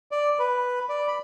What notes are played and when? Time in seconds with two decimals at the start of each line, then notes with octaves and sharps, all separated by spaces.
0.12 D5
0.39 B4
0.89 D5
1.08 B5